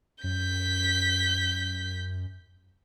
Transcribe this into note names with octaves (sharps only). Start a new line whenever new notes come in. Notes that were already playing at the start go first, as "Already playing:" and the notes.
F#2 G6 B6